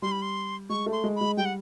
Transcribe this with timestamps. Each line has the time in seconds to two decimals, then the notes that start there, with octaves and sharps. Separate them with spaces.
0.02 G3 C6
0.12 B5
0.22 C6
0.69 G#3 C#6
0.86 A3
0.92 C6
1.04 G#3
1.16 B5
1.21 G#3
1.37 G3 G5
1.45 F#5